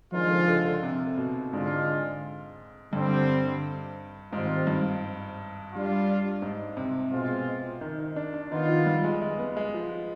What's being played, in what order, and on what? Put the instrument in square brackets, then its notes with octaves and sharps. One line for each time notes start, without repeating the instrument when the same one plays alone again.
[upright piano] D#3 [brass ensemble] F3 G#3 D4 F4
[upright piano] D3
D3
D3
C3
B2
[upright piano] G#2 [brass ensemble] D3 G#3 D4 F4
[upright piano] G2 [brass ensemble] D3 G3 C4
[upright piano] G#2 [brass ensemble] D#3 G3 C4 F4
[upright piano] G2
[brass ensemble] G3 D4 F4
[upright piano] G#2
C3
[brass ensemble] B2 G#3 C4 F4
[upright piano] D#3
D#3
D4
D4
[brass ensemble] D#3 B3 F4 [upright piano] D#4
[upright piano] F3
G3
G#3
G#3
B3
G#3
F3